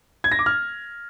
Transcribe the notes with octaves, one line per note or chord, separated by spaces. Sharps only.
G#6
A#6
D6
F6